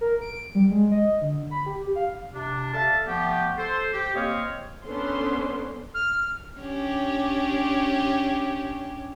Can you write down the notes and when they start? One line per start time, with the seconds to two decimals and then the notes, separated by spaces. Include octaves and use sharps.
0.01 A#4
0.21 D7
0.55 G3
0.70 G#3
0.91 D#5
1.21 D3
1.51 B5
1.66 G4
1.95 F5
2.34 C3 D4
2.74 A4 D5 E5 F5 A5
3.07 F3 A3 B3 G4
3.57 A4 C5
3.93 G4
4.15 A#3 C4 C5 C#5 D#5 F5
4.86 B3 C#4 D4 A4 C5 C6
5.94 F6
6.60 C#4 D4 G4